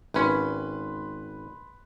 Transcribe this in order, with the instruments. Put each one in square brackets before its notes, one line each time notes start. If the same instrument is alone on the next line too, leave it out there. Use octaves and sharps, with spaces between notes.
[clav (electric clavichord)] G#1 C#4 [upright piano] B4 B5 C6